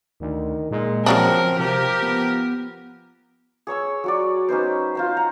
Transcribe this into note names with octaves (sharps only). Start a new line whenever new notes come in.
D2 D#3
A#2 G#3
C#3 F3 F#3 C4 D4 A#4
C3 F3 G4 A#4
B3
G#4 C#5 C#6 E6
F#3 F#4 D5
C#4 D#4 B4 C5
F4 C5 A#5
F#5 A#5